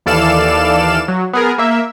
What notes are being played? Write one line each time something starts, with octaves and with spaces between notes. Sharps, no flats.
D#2 E3 A4 D5 F5 E7
F#3
B3 G#4 A#4
A#3 E5